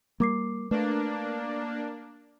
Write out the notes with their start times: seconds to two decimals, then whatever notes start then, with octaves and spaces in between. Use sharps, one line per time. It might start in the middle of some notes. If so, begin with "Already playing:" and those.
0.20 G3 A#3 A#4 D6 C7
0.71 A3 A#3 D4 B4